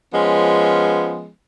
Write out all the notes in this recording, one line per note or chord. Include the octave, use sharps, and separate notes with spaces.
F3 G#3 B3 C#4